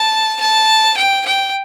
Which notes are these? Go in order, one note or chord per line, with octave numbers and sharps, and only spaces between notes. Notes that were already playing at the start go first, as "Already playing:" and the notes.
Already playing: A5
A5
G5
G5